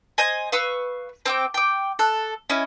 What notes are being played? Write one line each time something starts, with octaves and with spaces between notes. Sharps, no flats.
C5 D#5 G#5
B4 F5 C#6 E6
C4 G5 D6
G5 D6
A4 F#6
C#4 E4 D#5